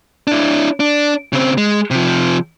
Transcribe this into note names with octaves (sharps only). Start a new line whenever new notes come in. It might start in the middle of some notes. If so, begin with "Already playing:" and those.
D4 E4
D4
C#3 C4
G#3
C3 F3